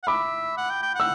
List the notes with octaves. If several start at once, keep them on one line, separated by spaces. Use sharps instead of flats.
F#5
E5 B5 D6
F#5
G5
G5
F#5 E6